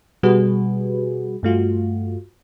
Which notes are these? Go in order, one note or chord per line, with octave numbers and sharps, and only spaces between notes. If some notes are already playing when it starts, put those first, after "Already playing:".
B2 G3 F#4 G#4 B4
G2 A3 F4 F#4